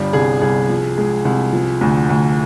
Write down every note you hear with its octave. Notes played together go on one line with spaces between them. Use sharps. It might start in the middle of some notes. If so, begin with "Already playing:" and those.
Already playing: G1 G3
C2 G#4
C2 G#4
F3
G#3
C2
F3
D2
D2